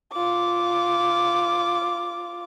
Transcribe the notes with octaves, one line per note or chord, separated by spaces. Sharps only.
F4 D6